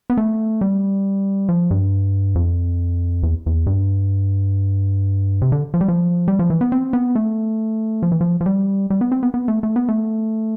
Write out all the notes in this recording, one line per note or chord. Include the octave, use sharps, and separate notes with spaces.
B3
A3
G3
F3
G2
F2
E2
E2
G2
C3
D3
F3
G3
F3
G3
F3
E3
B3
C4
B3
A3
F3
E3
F3
F3
G3
G3
B3
C4
B3
B3
A3
A3
B3
A3